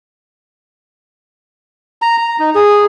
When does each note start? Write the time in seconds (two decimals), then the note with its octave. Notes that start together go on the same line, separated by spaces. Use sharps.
2.02 A#5
2.18 A#5
2.39 D#4
2.55 G#4